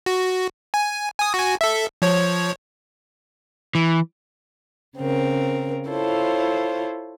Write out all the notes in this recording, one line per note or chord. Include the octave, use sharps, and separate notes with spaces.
F#4
G#5
G#5 D#6
F#4 G#5
A4 E5
F3 C#5
E3
C#3 C4 A#4
E4 F4 A4 C5 C#5